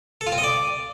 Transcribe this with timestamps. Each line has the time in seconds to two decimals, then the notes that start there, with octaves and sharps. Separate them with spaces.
0.21 A4
0.27 F4
0.32 C4
0.38 D#5
0.43 D5